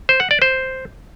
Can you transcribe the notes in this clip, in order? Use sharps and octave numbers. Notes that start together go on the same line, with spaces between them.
C5
F#5
D5
C5